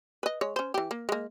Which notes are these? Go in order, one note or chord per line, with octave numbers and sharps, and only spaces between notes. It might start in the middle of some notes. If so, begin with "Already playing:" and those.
B4 D#5
G#3 C#5
C#4 C5
E3 G4
A#3
G#3 A#3